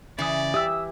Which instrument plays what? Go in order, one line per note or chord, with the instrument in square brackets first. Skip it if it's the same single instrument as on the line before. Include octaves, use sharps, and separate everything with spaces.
[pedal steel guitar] C#3 D#6 [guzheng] E3 [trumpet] D5
[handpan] G4 E5 [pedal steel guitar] D#6 E6